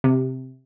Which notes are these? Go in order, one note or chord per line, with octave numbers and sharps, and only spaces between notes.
C3